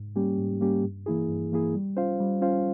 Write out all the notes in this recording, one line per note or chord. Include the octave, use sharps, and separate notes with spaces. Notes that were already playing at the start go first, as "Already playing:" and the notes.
Already playing: G#2
G3 A#3 C#4 G4
G#2
G3 A#3 C#4 G4
G2
E3 A#3 E4 G#4
G2
E3 A#3 E4 G#4
G3
C#4 F4 C5 F5
G3
C#4 F4 C5 F5